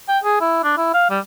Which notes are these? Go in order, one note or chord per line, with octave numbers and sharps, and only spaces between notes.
G5
G#4
E4
D4
E4
F5
G3